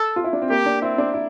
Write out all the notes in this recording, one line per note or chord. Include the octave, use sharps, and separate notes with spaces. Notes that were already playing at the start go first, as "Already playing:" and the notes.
Already playing: A4
F4
E4
D4
C4
A#3 G4
D4
C4 E4
D4
E4